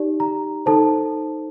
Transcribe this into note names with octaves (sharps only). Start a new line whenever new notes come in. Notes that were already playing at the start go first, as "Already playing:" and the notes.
Already playing: D#4 G4 D5
A#5
D#4 A4 C5 A5